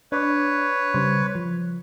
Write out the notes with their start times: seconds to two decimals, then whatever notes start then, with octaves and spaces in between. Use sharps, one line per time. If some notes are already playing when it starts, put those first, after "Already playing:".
0.12 D4 B4 C#5 D5
0.94 C#3 G3 C5
1.35 F3